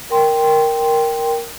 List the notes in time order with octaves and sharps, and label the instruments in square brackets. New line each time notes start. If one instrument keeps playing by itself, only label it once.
[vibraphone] A#4 G5 C6